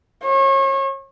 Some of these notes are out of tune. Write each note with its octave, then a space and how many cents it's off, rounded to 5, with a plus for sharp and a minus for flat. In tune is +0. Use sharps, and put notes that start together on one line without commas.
C#5 -35